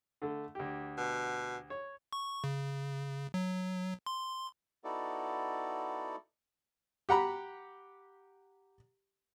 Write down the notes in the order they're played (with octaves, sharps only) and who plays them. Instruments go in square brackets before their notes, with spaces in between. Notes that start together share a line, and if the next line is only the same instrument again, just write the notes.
[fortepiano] D3 A3
D2 G4
[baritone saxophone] B2
[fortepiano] C#5
[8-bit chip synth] C#6
C#3
F#3
C6
[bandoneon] B3 D#4 E4 F#4 A4 D5
[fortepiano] G4 F#5 A#5 B5